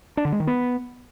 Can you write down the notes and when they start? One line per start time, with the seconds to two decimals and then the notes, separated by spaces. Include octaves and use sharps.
0.17 D4
0.25 D3
0.32 G#3
0.40 D#3
0.47 B3